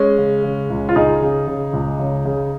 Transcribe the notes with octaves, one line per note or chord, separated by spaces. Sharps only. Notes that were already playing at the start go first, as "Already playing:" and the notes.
Already playing: G#3 C#4
C#3
C#3
C#2
F4
C#2 D#4 G#4
C#3
C#3
C#2
C#3
C#3